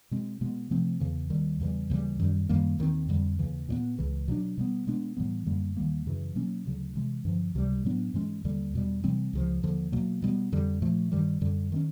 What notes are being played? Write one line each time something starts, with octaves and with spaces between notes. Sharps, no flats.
B2 G#3 C4
B2 G#3 B3
C3 F3 A3 C4
E2 C#3 E3
D#2 D#3 G3
E2 C#3 E3 G3
D#2 C#3 E3 G3
F#2 D#3 G3
F#2 D#3 G3 A#3
D#2 D#3 G3 C4
F2 D3 G3
D#2 C#3 E3
A#2 G3 B3
C#2 C#3 E3
B2 F#3 B3 D4
B2 G3 B3
B2 G#3 B3 D4
A2 E3 G3 B3
F#2 D3 G3 A#3
D#2 D#3 G3 A#3
F#2 C#3 E3
B2 F#3 A#3 C#4
D2 C#3 F#3
C3 E3 G#3
G2 D3 F3
C#2 C3 E3 G3
A2 F#3 B3 D4
G#2 E3 G#3 C#4
D#2 D3 G3
E2 B2 G3
C3 E3 G3 C4
C#2 C#3 F3
D#2 D3 F3
B2 F#3 A#3
B2 G3 B3
F2 D3 G3
A#2 F3 A3
G2 D#3 G3
F#2 D3 G3
D#3 G#3 C#4